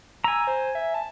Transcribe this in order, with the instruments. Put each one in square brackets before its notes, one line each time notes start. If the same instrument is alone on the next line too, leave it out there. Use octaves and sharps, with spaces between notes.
[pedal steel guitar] G#5 A#5 [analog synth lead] E6
[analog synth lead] C5
E5
A5